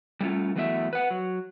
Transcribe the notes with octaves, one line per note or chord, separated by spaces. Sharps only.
G3 A3 C#4 F4
E3 F#3 A3 B3 D5 E5
B4 F#5
F#3